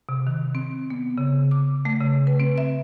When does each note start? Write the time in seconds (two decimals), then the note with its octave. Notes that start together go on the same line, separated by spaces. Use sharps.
0.09 C3
0.27 D#3
0.55 C4
0.90 B3
1.18 C#3
1.51 D6
1.85 A3
2.00 C#3
2.27 B4
2.40 C4
2.58 E5